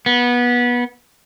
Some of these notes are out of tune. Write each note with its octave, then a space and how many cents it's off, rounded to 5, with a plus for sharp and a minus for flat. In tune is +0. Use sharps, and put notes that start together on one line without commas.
B3 -20